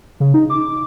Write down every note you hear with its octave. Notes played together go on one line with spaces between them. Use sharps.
C#3
D#4
D6